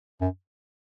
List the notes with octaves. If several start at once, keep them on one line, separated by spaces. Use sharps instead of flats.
F#2